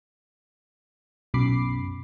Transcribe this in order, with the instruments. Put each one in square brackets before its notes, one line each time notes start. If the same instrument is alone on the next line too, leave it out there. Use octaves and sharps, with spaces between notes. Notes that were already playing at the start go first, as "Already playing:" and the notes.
[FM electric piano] B1 F#2 B5 D6 C7